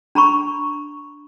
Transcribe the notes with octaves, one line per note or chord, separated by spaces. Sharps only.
D4 A#5 B5 C#6